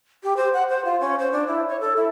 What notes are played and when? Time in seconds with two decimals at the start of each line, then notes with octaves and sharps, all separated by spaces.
0.23 G4
0.37 C5
0.54 F#5
0.69 C5
0.85 F4
1.00 C#4
1.19 C5
1.32 D4
1.47 E4
1.69 C#5
1.80 A4
1.96 E4